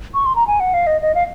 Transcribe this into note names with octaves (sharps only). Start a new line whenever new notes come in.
C#6
C6
A#5
G#5
F#5
F5
D#5
D#5
F5